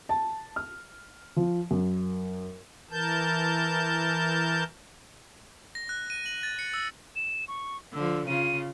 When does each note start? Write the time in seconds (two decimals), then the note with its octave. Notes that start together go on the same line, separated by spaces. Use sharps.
0.09 A5
0.56 F6
1.36 F3
1.71 F#2
2.91 E3 A#4 A5 G6
5.75 A#6
5.89 F#6
6.10 D#7
6.26 F#7
6.43 A6
6.59 C#7
6.74 E6
7.16 E7
7.48 C#6
7.93 D3 F3 E6
8.27 C#3 F4 D#7